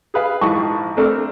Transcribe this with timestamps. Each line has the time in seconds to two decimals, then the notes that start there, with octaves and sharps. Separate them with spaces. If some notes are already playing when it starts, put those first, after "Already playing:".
0.14 G#4 B4 F5
0.41 A#1 G#2 E3 A5 C#6
0.97 A3 C4 D4 A4 A#4